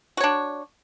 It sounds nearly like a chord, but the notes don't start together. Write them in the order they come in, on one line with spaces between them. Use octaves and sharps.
F#4 C#5 D4